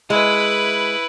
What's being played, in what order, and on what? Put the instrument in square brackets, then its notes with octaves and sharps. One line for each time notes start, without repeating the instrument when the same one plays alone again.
[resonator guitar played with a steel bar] G#3 [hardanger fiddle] E4 B4